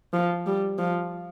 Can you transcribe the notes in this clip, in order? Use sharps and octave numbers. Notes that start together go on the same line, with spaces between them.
F3
G3
F3